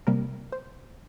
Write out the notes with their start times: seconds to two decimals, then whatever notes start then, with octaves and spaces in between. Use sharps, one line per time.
0.07 C3 G3 A#3 A#4
0.52 C5